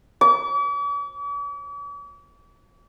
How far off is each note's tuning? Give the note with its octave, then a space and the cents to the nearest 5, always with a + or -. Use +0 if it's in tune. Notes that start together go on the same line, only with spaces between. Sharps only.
D6 -45